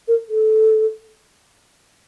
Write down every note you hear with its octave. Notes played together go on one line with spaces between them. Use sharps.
A#4
A4